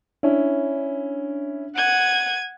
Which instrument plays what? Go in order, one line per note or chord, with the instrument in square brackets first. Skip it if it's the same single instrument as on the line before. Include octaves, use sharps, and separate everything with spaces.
[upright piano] C#4 E4 [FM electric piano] D4
[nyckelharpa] F#5 [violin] G#6 D#7